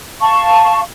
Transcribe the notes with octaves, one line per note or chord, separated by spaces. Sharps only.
F5 A5 C#6